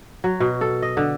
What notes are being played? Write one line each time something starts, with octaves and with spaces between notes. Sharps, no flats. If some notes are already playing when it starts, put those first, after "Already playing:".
F#3
B2
A4
D#5
D3